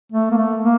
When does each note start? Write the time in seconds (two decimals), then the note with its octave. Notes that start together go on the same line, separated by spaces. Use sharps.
0.12 A3
0.31 A#3
0.37 A3
0.62 A#3